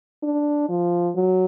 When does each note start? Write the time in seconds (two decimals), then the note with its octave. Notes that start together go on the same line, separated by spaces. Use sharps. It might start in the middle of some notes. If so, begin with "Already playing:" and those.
0.23 D4
0.69 F3
1.16 F#3